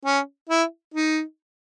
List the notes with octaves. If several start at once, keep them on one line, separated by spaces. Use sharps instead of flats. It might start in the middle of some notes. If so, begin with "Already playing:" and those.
C#4
E4
D#4